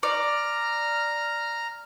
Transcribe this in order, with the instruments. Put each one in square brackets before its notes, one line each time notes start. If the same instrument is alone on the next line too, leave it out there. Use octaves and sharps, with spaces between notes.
[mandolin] D5 [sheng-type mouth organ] A#5 F6